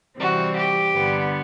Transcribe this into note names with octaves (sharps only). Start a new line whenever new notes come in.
C3 E3 G3 C4 F#4
G4
G2 D3 G3 B3